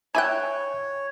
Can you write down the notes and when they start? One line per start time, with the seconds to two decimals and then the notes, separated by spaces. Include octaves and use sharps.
0.15 E4 C#5 E5 G5 G#5 F#6 G#6